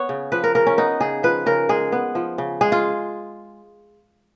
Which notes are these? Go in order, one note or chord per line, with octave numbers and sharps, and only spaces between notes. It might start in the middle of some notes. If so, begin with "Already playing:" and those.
Already playing: B3 C#5
C#3
F3 B4
A#4
C#3 A#4
C#4
B3 D#4
C#3 G#4
F3 B4
C#3 A#4
G#3 G#4
B3
F3
C#3
G#3 G#4
F4